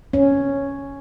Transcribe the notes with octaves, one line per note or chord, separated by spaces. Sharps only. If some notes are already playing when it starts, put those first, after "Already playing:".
C#4